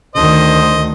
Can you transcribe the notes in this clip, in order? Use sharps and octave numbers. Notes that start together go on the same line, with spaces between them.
D2 D#3 C5 D#5